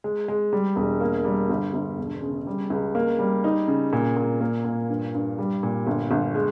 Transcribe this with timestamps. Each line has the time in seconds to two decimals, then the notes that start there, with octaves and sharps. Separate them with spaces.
0.04 G#3
0.28 G#3
0.53 G3
0.76 E1
1.00 A#3
1.25 G3
1.49 G1
1.73 G1
1.98 E1
2.22 C#3
2.47 G3
2.70 C#2
2.95 A#3
3.19 G3
3.44 D#4
3.68 C#3
3.93 A#2
4.17 A#2
4.41 A#3
4.65 A#2
4.90 G2
5.14 G2
5.39 G3
5.63 A#2
5.87 G1
6.11 G1
6.35 G#3